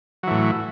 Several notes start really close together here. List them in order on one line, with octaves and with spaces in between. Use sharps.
F#3 E3 A2